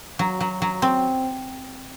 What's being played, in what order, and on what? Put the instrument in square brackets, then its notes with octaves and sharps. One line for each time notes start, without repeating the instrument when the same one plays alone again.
[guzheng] F#3
F#3
F#3
C4